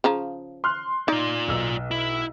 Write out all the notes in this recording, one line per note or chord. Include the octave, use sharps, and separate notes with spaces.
C#3 F3 A#5
C6 F6 F#6
D#4 F4 D5
B1 E6
E4